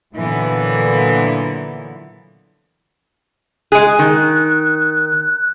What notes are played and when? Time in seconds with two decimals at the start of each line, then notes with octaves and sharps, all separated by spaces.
0.15 A#2 D3 E3 F#3 B3
3.72 G#3 G#4 F#6
3.99 D#3